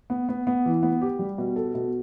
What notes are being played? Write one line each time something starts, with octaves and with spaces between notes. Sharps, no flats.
B3
B3
B3
E3
B3
G4
G3
B2
A4
B2